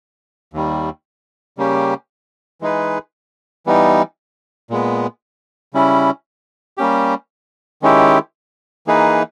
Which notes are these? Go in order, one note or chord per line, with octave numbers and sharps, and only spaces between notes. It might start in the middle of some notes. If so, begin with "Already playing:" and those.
D#2 D#3 G3
C#3 G3 A#3 C#4 G4
E3 G#3 D#4 G#4 B4
E3 G3 B3 D#4
A#2 G#3 B3
C#3 G3 C#4 E4
G3 A#3 C#4 G4
D#3 G#3 C#4 E4 G4
E3 A#3 D#4 G#4 B4